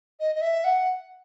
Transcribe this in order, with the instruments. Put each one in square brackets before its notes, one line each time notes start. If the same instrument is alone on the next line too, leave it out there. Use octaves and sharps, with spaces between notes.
[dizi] D#5
D#5
E5
F#5